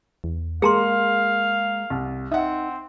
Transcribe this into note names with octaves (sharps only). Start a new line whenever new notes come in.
E2
G#3 A#3 G#4 F5 A#5 C6
C2
C4 D#4 E5 F#5